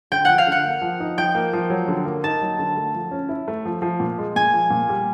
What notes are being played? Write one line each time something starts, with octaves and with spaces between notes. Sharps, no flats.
D3 G5
F3 F#5
F5
D3 F#5
A#3
F3
D#4
F3 G5
A#3
F3
F#3
D3
A#3
D#4 A5
F#3
D3
A3
F3
C#4
E4
A3
F3
F3
A#2
G#3
A#2 G#5
F3
A#2
G3